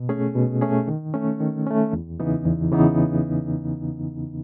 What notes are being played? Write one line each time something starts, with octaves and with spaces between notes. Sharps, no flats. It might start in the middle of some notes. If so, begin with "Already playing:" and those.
Already playing: B2
A3 C#4 G#4
B2
A3 C#4 G#4
D#3
A3 C#4
D#3
A3 C#4
E2
C#3 E3 B3 D#4
E2
C#3 E3 B3 D#4